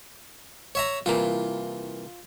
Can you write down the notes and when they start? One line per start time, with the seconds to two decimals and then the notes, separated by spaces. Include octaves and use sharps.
0.75 C#5 E5 A#5
1.06 C2 E3 A#3 F4